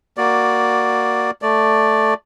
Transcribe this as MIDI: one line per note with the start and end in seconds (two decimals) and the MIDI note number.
0.17 1.31 58
0.17 1.31 66
0.17 1.31 74
1.42 2.14 57
1.42 2.14 74